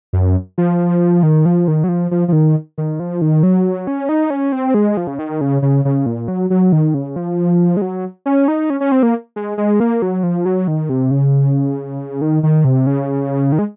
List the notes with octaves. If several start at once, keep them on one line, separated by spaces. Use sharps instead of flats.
F#2
F3
D#3
F3
D#3
F#3
F3
F3
F3
D#3
D#3
F3
D#3
F#3
C#4
D#4
C#4
C4
G#3
F3
C#3
D#3
C#3
C#3
C#3
A#2
F#3
F#3
D#3
C#3
F3
G#3
F#3
C#4
D#4
C#4
C#4
C4
A#3
G#3
G#3
A#3
F#3
F3
F#3
D#3
C3
C#3
D#3
D#3
C3
C#3
D#3
G#3